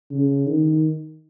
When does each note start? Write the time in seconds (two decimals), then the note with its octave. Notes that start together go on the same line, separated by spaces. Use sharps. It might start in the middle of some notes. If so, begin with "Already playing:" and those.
0.11 C#3
0.46 D#3